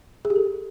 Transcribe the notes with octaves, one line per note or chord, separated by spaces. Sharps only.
G#4
G4
A4